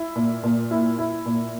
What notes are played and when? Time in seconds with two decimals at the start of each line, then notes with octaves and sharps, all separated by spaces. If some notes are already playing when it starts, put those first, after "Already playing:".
Already playing: E4
0.16 A#2
0.43 A#2
0.71 E4
0.98 E4
1.26 A#2